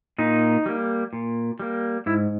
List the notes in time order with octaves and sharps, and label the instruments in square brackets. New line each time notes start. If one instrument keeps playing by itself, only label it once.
[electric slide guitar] A#2 D#4
G3 A#3
A#2
G3 A#3
G#2 E4